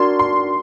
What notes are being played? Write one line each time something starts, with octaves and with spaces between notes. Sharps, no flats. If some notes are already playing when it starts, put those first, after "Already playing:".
Already playing: D4 F#4 A#4 D5 C6
C6